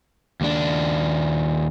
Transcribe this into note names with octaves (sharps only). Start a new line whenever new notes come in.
D#2 D4